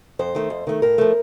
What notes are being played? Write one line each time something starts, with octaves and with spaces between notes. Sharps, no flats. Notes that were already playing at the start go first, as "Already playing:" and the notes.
F2 C5
D#3 A3
F2
D#3 A3
A2 A#4
F3 A3